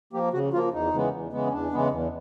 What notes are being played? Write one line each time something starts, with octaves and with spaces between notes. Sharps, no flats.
F3 A#3 G4
C#3 F#4
F3 A#3 F4
E2 D#4
C#3 E3 G#3 B3
E2
C#3 E3 G#3 B3
C#4
E2 D4
C#3 E3 G#3 B3
E2